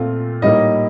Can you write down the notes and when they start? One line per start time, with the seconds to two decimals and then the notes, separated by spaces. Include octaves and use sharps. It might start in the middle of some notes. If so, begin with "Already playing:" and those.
Already playing: A#2 A3 C4 F4
0.42 A2 G3 A#3 D#4 D#5